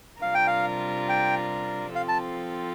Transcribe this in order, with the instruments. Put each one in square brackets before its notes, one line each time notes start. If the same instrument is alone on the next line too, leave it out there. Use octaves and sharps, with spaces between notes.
[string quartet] C3 G3 D4 F4 A#4 [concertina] F5
[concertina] G5
F5
G5
[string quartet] F3 C4 F4 A4 [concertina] F5
[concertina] A5